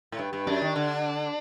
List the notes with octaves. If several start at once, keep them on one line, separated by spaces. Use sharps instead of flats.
A2
G2
G2
F#2 D4
D#3
D3